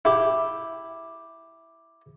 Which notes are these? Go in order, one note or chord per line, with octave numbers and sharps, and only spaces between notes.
E4 G4